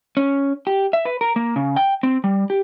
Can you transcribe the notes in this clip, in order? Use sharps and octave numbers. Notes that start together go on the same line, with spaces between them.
C#4
G4
E5
B4
A#4
A#3
C#3
G5
C4
G3
G4